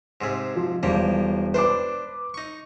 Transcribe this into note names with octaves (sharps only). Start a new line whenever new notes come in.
G#2 C3 G#4
F3
E1 F3 G3 A#3
D4 B4 C5 D6
D#4 C#6